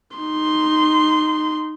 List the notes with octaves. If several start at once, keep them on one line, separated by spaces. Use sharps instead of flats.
D#4 C6